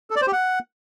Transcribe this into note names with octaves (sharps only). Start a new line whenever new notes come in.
A4
D5
C5
G4
F#5